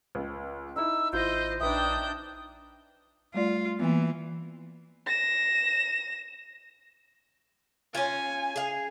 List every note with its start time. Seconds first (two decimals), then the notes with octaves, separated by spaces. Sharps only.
0.15 C#2
0.76 D#4 E4 E6
1.13 G#1 E4 F4 C5 D#5 G6
1.61 A#1 D4 D#4 B4 E5 G5 D#6 G6
3.34 G3 A3 F4 D5
3.80 E3 A#3 B3
5.06 A#6 E7
7.95 C#4 F4 G#5
8.56 G#4 F5